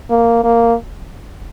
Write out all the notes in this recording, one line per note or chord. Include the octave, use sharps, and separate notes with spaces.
A#3
A#3